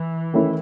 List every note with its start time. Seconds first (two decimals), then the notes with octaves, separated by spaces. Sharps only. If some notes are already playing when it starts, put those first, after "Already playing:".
Already playing: E3
0.33 D#3 A3 C#4 E4